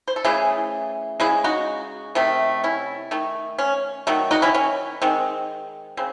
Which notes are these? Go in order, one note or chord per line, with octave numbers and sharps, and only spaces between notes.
C5
A4
C#3 E3 A3 E4 G#4
C#3 G#3 E4 G#4
D#4 F#4
C3 D#3 A3
C#4 E4
D#3 A3
C#4
D#3 F#3 A3
D#4 F#4
C#4 E4
C#4
D#3 G#3 C4
C#3 C4